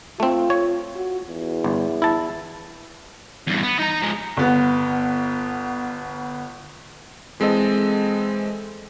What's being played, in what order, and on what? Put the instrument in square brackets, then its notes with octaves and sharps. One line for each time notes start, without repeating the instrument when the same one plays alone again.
[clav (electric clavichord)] A3 C4 [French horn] F4
[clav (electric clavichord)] C#5
[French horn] F#4
E2
[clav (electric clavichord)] G1
E4 A5
[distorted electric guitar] E2 G2
B3
D#4 A#5
F3 G#3
[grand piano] G1 B3
[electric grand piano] E3 G#3 C4 A4 D#5